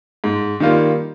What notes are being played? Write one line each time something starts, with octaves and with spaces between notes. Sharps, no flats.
G#2
D#3 G3 A#3 F4